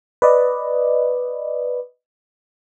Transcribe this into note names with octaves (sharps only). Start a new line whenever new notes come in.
B4 D5 D#5